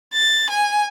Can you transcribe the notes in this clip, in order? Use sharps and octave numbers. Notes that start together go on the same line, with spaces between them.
A6
G#5